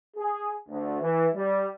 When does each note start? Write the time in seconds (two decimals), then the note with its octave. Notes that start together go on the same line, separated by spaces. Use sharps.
0.16 G#4
0.68 D2
1.01 E3
1.33 G3